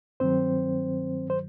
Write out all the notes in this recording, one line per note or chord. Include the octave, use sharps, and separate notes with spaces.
G2 D#3 F#3 C4 C5
C5